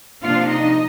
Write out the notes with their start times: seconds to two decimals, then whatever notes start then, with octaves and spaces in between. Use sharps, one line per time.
0.22 C3 F3 A#3 D4 F4 F5
0.51 D#4 D#5